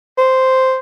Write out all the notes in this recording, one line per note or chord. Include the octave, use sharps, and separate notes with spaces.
C5